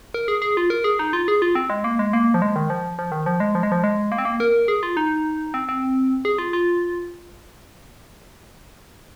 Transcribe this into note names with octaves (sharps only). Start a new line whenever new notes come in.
A#4
G#4
G#4
F4
A#4
G#4
D#4
F4
G#4
F4
C4
G#3
A#3
G#3
A#3
F3
G#3
D#3
F3
F3
D#3
F3
G#3
F3
G#3
F3
G#3
A#3
C4
A#3
A#4
G#4
F4
D#4
C4
C4
G#4
F4
F4